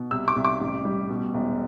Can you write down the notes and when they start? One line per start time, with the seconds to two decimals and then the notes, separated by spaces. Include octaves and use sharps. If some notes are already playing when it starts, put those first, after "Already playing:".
Already playing: B2
0.11 C2 E6
0.28 D6
0.36 C2
0.44 D6
0.61 A1
0.85 G3
1.09 B2
1.34 E1